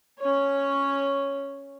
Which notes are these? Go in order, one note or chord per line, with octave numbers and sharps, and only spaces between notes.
C#4 C#5